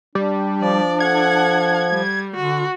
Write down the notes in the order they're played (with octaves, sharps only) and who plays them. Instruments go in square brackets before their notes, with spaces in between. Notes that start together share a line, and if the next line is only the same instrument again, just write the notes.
[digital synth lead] G3 [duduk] D4
[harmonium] F3 [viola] D5
[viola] A4 F#5 [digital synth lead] G#6
[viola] G3
[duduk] D3 [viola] F#4